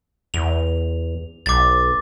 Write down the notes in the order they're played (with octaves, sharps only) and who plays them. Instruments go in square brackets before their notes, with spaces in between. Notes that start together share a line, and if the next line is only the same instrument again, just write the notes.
[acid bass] E2 [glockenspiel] F7
[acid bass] B1 [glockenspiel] D6 A6